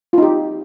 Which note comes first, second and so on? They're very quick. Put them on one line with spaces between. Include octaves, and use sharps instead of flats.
F4 D#4 G4